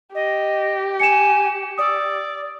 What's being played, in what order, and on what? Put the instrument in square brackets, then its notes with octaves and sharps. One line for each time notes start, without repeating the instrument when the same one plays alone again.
[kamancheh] G4 [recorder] D#5
[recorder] G#5 [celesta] C#7 E7
[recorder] D5 [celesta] D#6 E6